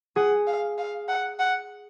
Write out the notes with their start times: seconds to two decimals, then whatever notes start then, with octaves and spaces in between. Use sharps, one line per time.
0.16 G#4 F#5
0.47 F5
0.78 F5
1.08 F#5
1.39 F#5